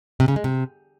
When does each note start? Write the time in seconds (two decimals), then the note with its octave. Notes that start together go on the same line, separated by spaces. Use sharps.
0.20 C3
0.28 C#3
0.36 G#3
0.44 C3